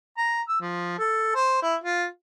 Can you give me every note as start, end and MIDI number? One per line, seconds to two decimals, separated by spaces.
0.17 0.42 82
0.49 0.56 88
0.61 0.97 53
0.99 1.31 69
1.35 1.61 72
1.63 1.76 64
1.84 2.06 65